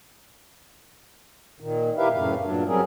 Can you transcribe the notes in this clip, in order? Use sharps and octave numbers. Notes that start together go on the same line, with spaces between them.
A#2 D#3
E4 G4 A#4 B4 E5 F5
F#2 A2 C#3 A3 F5
G2 A#2 F#3 D4
F#3 G3 C4 C#4 G#4 A#4